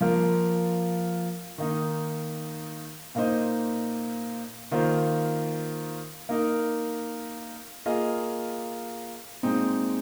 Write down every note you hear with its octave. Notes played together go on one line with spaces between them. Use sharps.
F3 A#3 F4 A#4
D#3 A#3 D#4
A#2 A#3 D#4 C5 D#5
D#3 A#3 F4 C5
A#3 D#4 A#4
A#3 F4 G#4 D#5
A#2 G#3 C4 D#4